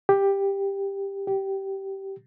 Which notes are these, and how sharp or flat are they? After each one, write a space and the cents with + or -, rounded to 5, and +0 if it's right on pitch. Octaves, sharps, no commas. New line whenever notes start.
G4 +10
G4 -15